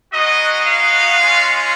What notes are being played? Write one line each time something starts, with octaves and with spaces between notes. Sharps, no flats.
G#3 B3 D#4 F#4 D#5
F5
G#3 C#4 F4